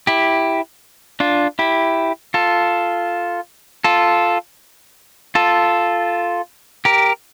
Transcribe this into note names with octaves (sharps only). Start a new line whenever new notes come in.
E4 G4
D4 F4
E4 G4
F4 A4
F4 A4
F4 A4
G4 A#4